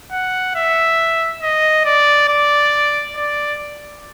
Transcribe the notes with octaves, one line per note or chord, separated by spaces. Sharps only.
F#5
E5
D#5
D5
D5
D5